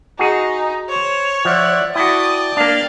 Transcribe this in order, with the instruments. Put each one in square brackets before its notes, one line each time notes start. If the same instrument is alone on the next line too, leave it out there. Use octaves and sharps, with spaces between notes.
[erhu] D#4 [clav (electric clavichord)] F#4 G#4
[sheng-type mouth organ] C5 [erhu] C#5
[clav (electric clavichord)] F3 [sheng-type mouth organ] D5 E5 F#5
[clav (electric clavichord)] E4 F#4 [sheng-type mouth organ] D5 G5 A5 [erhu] D#6
[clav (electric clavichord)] A#3 D4 [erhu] F5